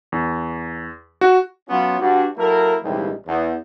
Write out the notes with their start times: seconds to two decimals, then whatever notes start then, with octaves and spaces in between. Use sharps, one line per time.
0.12 E2
1.21 F#4
1.69 F#3 B3 C#4 F4
1.99 G2 D4 F#4
2.37 F#3 A#3 E4 A4 A#4
2.83 A#1 D#2 C3 E3 G3 G#3
3.26 E2